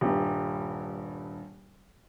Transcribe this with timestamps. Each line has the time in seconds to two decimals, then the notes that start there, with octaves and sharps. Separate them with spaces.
0.01 D#1 G2